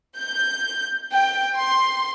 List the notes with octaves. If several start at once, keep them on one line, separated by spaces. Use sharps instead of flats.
G6
G5
C6